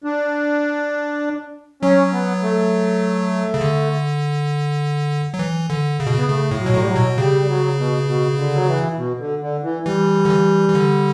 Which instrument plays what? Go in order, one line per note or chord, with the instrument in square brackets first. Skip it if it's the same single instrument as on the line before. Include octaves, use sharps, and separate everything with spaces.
[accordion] D4
[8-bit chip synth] F#3 [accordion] C#4
[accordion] B3
A3
[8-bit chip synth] C#3
D3
F#3
E3
D3
C#3
B2
[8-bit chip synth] C#3 [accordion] B3
[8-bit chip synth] C#3 [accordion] A3
[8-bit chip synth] A2
[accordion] F#3
[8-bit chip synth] B2
[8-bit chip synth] A2 [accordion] A3
[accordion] G3
F#3
[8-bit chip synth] B2
[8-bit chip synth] C#3 [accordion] G3
[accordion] G3
F#3
B2
B2
D3
F#3
E3
B2
D3
D3
E3
[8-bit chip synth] E3 [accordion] G3
[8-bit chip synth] D3
E3
E3
D3